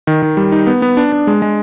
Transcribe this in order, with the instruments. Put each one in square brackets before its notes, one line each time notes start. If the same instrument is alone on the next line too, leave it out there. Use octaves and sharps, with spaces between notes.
[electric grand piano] D#3
D#3
G3
D#4
B3
B3
D4
D4
G#3
G#3